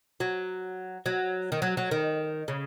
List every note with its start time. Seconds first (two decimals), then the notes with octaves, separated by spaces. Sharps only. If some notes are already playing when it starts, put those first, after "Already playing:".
0.20 F#3
1.06 F#3
1.52 D#3
1.62 F#3
1.77 F#3
1.91 D#3
2.48 C#3